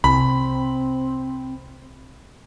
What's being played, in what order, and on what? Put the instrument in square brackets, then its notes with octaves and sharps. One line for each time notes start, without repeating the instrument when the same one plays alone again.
[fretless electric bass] C2 [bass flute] C4 [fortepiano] B5